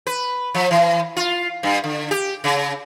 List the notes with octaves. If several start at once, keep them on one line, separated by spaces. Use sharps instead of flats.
B4
F3
E3
F4
G2
D3
G4
C#3